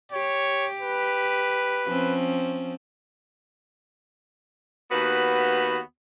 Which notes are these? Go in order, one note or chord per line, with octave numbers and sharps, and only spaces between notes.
G4 C#5
B4
F3 C4 C#4
D#2 B3 F#4 B4